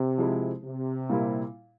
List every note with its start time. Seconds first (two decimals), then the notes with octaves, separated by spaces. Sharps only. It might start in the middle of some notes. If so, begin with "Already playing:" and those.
Already playing: C3
0.18 F3 G#3 E4
0.64 C3
1.09 A#2 G3 A#3 E4